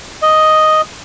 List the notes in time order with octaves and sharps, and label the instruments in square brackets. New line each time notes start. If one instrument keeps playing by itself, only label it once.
[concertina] D#5